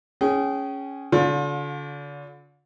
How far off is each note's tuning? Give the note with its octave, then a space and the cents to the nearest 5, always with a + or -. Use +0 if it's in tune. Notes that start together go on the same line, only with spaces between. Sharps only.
C#4 +0 G#4 +0 G5 -30
D3 -35 F4 +40